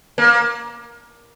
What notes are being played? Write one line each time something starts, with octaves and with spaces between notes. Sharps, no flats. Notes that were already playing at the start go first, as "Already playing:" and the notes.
A#3